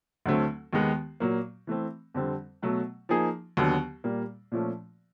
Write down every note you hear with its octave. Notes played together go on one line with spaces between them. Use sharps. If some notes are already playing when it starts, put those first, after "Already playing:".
D2 D3 F#3 A3 C4
D#2 D#3 G#3 B3
A#2 F#3 A#3
E3 A3 C4
F2 D3 G3 C4
B2 F#3 A3
F3 A#3 D#4 G#4
D#2 D3 F#3 B3
A#2 G3 A#3
A#2 F3 A3 C#4